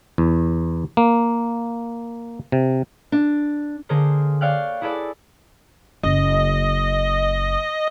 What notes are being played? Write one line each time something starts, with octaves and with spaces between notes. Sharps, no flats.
E2
A#3
C3
D4
D3 A#3 G#4 A#4 C5
C#5 D5 F5 G5 F6 F#6
E4 G#4 A4 B4 D5
F#1 D#5